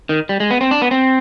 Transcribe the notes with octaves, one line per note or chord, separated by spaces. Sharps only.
D#3
G3
G#3
B3
C4
D4
B3
C4